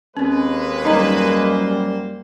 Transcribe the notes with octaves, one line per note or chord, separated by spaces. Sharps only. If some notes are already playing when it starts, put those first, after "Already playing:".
D#2 G#3 C4 C#4 B4
F#2 G3 A#3 D#4 C5 D#5 A#5